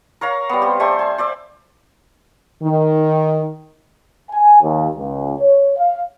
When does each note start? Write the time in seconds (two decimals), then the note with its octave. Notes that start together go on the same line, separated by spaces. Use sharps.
0.21 A#4 C#5 F5 A#5
0.49 G3 B3
0.62 C4 G4
0.79 G3 A3 C5 G#5
0.99 G#5
1.18 C5 D5 E5
2.63 D#3
4.31 G#5
4.62 D#2
4.97 C#2
5.39 C#5
5.78 F5